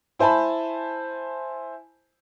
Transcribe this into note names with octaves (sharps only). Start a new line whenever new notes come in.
E4 C5 G#5 A5 B5